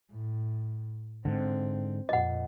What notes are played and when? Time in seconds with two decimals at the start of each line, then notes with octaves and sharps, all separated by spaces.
0.11 A2
1.25 G#2 D3 C4
2.09 F2 A#2 D#5 F#5